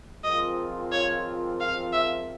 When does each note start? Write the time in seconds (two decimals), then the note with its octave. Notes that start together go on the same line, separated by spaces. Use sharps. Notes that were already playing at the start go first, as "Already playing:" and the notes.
0.24 F3 G#3 C4 F4 A#4 D#5
0.92 C#5
1.60 F5
1.93 E5